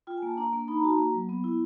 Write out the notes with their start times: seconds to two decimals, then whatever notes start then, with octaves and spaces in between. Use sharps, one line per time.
0.07 F4 G5
0.17 G#5
0.22 A#3 A5
0.37 D4 A#5
0.53 A#3
0.68 D#4 B5
0.76 A#5
0.83 F#4 A5
0.93 A#5
0.98 A#3
1.14 F#3
1.29 B3
1.44 E4